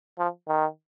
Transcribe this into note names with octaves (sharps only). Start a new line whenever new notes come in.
F3
D#3